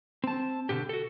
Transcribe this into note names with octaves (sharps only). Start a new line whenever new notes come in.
C4 A5
B2 D3 G4
F#4 A4